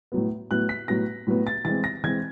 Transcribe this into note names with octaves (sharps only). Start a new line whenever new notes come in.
A2 F#3 B3
A2 F#3 B3 F#6
B6
A2 F#3 B3 A#6
A2 F#3 B3
A6
E3 G#3 C4 A6
A#6
E3 G#3 C4 G#6